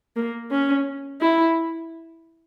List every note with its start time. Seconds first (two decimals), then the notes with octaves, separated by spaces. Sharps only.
0.16 A#3
0.51 C#4
1.21 E4